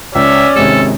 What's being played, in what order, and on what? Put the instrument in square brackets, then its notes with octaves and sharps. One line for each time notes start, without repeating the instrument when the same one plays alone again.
[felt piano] C#2 [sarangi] C#4 [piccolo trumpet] D5 [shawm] E5
[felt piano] G#1 C3 G#3 [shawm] A4